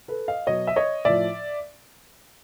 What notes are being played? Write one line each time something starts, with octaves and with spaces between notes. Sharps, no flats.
A4 B4
D#5 F5
B2 F#3 C#5 D#5
E5
C#5 D#5
A2 F3 D5 E5